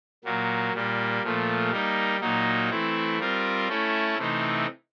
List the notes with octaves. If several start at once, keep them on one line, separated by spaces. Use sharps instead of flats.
A#2 F#3 A#3
A#2 G3 A#3
A#2 F3 A3
G3 A#3 D#4
A#2 F#3 A#3 D#4
E3 A3 C4 E4
G3 C4 F4 A#4
A3 C#4 E4 A4
C3 E3 A3 C4 D#4